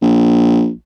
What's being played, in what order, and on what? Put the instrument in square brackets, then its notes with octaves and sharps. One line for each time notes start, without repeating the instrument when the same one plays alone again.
[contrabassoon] A#1